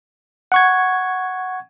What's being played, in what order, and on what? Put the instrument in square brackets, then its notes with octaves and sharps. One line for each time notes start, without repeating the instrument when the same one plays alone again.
[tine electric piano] F#5 C#6 G#6